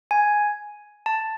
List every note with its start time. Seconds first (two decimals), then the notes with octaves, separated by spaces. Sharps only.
0.11 G#5
1.06 A5